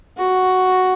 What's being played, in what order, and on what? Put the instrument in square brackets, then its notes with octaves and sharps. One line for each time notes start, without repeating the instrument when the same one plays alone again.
[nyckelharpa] F#4